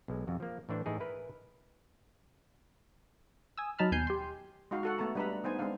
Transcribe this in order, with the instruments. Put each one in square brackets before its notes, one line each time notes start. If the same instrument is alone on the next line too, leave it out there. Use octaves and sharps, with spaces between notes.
[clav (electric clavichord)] B1 G#3
F2 F#4
F3 A#3
A2 E3 D4 C5
A2 E3 D#4 E4 G#4
E4 A#4 B4
[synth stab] G#5 D#6 E6
F#3 D#4 A5 B5 F6
D#2 B2 G#5 G6 C7
G4 C6
[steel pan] G#3 D#4 F#4 F5
F#4 A4 F#5
A3 B3 A4 A5 A#5
G3 D4 B4 D#5 A#5 B5
B3 D#4 C5 G#5
G#3 C4 D4 F5